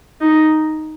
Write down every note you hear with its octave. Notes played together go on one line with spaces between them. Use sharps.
D#4